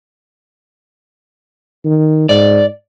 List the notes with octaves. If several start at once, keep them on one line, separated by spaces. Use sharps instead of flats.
D#3
G#2 D5